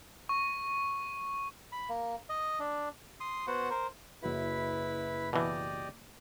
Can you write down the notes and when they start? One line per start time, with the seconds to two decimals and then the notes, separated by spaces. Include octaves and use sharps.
0.29 C#6
1.72 B5
1.89 A#3
2.29 D#5
2.59 D4
3.20 C6 D#6
3.47 B3 F#4 C5 F#5
3.70 A#4 C5
4.23 F#1 E4 F#4 B4 E5 B5
5.33 B2 E3 G4 D5 D#5